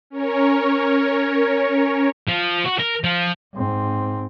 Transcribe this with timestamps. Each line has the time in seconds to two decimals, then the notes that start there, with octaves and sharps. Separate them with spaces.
0.10 C#4 A#4 C#5
2.29 F3
2.66 F#4
2.79 A#4
3.04 F3
3.54 G#2 C4